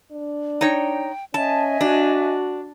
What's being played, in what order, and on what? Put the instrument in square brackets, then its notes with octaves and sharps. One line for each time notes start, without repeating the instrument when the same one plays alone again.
[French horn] D4
[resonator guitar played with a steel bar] D#4 C#5 [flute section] G5
[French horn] C#4 [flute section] D#5 E5 G#5 [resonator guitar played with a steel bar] A5
[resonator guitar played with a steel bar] D4 [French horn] F#4